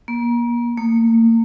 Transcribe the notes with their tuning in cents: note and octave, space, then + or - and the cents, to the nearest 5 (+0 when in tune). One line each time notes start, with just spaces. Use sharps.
A#3 +35
A#3 -35